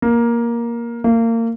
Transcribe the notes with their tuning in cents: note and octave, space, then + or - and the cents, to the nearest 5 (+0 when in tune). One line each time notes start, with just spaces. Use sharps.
A#3 +10
A#3 -30